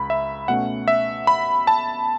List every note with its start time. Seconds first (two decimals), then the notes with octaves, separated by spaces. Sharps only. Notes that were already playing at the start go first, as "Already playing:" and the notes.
Already playing: C#2 B5
0.10 E5
0.48 B2 A3 C#4 F#5
0.88 E5
1.27 B5
1.67 A5